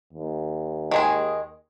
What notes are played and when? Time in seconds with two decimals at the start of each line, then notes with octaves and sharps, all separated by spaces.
0.13 D#2
0.91 D#3 G#3 G#4